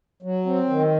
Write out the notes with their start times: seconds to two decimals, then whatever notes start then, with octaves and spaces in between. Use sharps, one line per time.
0.22 F#3
0.46 C4
0.69 D#3